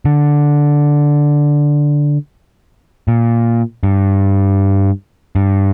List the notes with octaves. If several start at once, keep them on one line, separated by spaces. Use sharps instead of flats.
D3
A#2
G2
G2